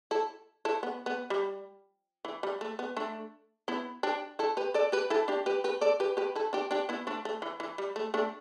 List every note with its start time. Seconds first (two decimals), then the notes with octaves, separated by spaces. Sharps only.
0.11 E4 A4
0.65 E4 A4
0.83 B3
1.06 B3
1.30 G3
2.25 E3
2.43 G3
2.61 A3
2.79 B3
2.97 A3 D4
3.68 B3 E4
4.03 D4 G4
4.39 E4 A4
4.57 G4 B4
4.74 A4 D5
4.92 G4 B4
5.10 E4 A4
5.28 D4 G4
5.46 G4 B4
5.64 G4 B4
5.81 A4 D5
6.00 G4 B4
6.17 G4 B4
6.35 E4 A4
6.53 D4 G4
6.71 D4 G4
6.89 B3 E4
7.07 A3 D4
7.25 A3
7.42 E3
7.60 E3
7.78 G3
7.96 A3
8.14 A3 D4